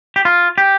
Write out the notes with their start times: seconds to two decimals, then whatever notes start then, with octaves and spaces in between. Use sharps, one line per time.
0.16 G4
0.25 F4
0.58 G4